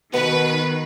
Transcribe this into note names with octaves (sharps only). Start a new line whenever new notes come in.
B2 D#3 B3 B4